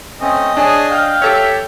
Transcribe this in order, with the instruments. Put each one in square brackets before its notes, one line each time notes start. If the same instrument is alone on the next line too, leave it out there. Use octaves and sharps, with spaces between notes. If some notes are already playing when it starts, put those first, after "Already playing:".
[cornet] A3 [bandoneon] C4 C#4 [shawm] D#5
[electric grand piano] D4 [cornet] G#4 [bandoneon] C#5 G#5 A5
[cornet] F5 [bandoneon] G5
[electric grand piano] G4 A4 C#5 [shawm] E5